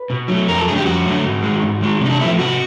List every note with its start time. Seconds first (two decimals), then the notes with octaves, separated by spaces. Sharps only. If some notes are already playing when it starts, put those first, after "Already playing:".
Already playing: B4
0.10 B2
0.28 F#3 A3
0.48 F2 A#4
0.57 A4
0.67 D3 F#3 A3 G#4
0.76 G4
0.86 F2 F#4
1.05 D3 F#3 A3
1.24 G#2
1.43 D#3 G#3
1.62 G#2
1.81 D#3 G#3
2.01 C3 D#4
2.09 D4
2.20 F3 A3 E4
2.39 C3 F#4